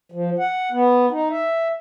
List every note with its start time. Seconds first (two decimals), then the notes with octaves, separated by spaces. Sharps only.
0.12 F3
0.39 F#5
0.72 B3
1.11 D#4
1.30 E5